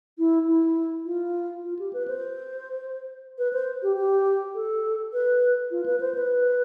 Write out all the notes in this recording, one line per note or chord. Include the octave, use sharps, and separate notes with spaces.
E4
E4
F4
F4
G4
B4
C5
B4
C5
G4
G4
A4
B4
F4
B4
C5
B4